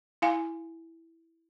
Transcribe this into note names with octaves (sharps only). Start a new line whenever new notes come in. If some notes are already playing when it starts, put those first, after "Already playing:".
E4 F5 G#5